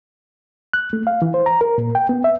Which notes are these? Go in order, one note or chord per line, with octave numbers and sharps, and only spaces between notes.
F#6
A3
F5
E3
C5
A#5
A#4
A#2
G5
B3
E5